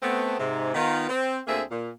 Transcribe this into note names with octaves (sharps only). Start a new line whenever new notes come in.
A3 B3 C4
G#2 C3
D#3 B3 F4
C4
D2 D3 A#3 C4 G#4 E5
A#2